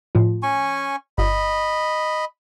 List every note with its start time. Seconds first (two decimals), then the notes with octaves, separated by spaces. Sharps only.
0.15 A2 F3
0.43 C#4 G#5 C#6
1.18 G1 D#5 B5